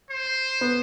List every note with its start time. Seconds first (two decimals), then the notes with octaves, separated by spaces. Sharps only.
0.10 C5
0.61 B3